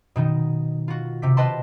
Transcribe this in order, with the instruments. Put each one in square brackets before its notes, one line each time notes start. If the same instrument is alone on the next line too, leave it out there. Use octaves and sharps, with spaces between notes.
[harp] B2 D#3 D#4
F4 F#4
C3 G4 B6
B4 D#5 G5 A5 C6